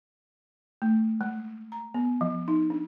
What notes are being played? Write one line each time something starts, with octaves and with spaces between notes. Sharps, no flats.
A3
G#3
A#5
B3
F3
D#4
D4